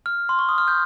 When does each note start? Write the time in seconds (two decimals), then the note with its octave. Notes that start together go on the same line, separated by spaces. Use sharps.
0.06 F6
0.29 C6
0.39 C#6
0.49 D#6
0.58 F6
0.68 G6